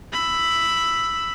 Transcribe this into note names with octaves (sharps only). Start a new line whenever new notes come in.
B5 E6